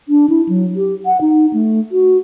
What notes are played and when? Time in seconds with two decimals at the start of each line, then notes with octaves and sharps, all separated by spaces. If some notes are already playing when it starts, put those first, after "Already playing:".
0.09 D4
0.30 E4
0.49 F#3
0.76 G4
1.06 F#5
1.21 D#4
1.53 A3
1.92 F#4